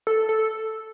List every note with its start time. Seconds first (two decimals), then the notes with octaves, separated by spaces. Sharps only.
0.07 A4
0.29 A4